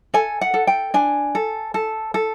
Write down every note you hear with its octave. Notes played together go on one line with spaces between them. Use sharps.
A4 G#5
F#5
A4
G5
D4 G#5
A4
A4
A4